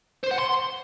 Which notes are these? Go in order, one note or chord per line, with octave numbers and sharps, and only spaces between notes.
C5
F#5
C6